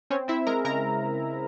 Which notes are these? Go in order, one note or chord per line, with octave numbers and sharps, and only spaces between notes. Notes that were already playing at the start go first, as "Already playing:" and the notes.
C4 C#4 C#5
C4 E4 E5
G#3 A#4 A#5
C#3 A#4 A#5